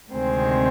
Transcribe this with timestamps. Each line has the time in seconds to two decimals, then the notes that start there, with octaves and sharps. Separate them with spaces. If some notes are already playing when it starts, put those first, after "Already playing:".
0.12 D2 C3 D#3 G#3 C4